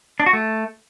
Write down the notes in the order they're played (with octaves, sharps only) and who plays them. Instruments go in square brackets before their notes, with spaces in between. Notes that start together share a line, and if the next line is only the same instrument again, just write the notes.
[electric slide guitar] D4
F#4
A3